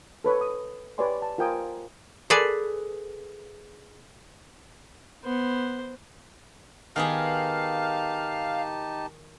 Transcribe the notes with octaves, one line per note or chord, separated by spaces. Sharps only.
A4 B4 C#5
D#6
G4 B4 C#5 D5 G#5 C6
A5
F4 A#4 C5 G5 G#5 D#6
G#4 A4 B4 D5 G#5
B3 C5
D#3 B3 D#4 G4 G#4 F5 A5